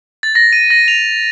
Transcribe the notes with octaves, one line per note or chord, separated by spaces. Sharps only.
A6
A#6
D#7
A#6
F7